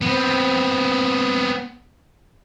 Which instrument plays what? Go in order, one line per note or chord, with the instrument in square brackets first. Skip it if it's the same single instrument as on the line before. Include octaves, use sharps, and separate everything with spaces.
[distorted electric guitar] B3 C4